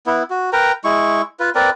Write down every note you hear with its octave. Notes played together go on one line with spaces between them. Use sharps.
B3 E4
F#4
A#4 B4 G5 A#5
G#3 E4 C#6
F4 B4
C4 A#4 B4 D5